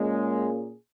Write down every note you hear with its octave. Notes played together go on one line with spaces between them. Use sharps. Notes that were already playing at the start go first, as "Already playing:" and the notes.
Already playing: A#2 G#3 A#3 C#4 G#4